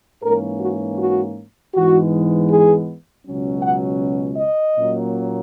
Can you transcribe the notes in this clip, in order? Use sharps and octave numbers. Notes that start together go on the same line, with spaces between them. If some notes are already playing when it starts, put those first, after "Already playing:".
G#2 E3 A#3 C#4 A#4
F#4
F#4
G#2 E3 G#3 B3 F#4
G#4
C#2 B2 F#3 C#4
F#5
D#5
A#2 F#3 A#3 C#4